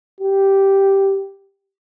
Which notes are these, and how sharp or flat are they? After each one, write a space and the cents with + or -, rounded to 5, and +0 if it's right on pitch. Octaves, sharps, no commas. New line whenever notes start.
G4 -5